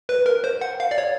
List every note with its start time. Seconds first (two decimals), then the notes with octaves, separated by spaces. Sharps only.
0.09 B4
0.26 A#4
0.44 C5
0.61 F#5
0.80 F5
0.91 D5
0.98 C#5